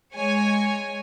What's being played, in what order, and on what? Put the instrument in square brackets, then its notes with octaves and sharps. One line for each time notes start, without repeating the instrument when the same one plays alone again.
[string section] G#3 C#5 G#5